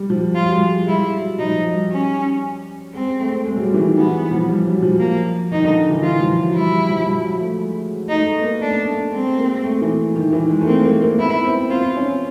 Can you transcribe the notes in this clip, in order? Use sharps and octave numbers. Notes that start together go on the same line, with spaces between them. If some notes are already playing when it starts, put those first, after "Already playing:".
Already playing: G3
F3
F#3 F4
G3
G#3
G3 E4
F#3
F3 D#4
F3
F#3
G3
C#4
G#3 C4
A3
G#3
F#3
G3
E3
D#3
E3 B3
F3
G3
F#3
F3
A#3
D#3 D#4
D3
E3
E3 F4
F3
F#3
G3 E4
G3
F3
F3
F#3
A3
G#3
A3 D#4
A3
B3
A#3
A3 D4
A3
G#3 C4
A#3
A3
E3
D#3
E3
G#3
A3
A#3 C4
A#3
A#3
B3 E4
C4
C4 F4
C#4